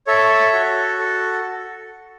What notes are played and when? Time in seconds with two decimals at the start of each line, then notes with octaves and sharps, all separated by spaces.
0.07 A4 C#5 E5
0.53 F#4
0.99 A4